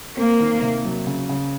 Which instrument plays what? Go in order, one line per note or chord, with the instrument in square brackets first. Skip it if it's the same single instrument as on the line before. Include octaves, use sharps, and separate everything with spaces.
[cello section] A#3 [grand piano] C4
[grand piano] D#3
C3
F#3
C#3
C#3